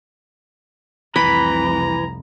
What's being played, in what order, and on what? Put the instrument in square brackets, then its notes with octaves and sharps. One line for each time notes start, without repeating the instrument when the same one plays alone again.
[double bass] F1 C2 [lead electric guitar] E3 [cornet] A#5 [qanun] B5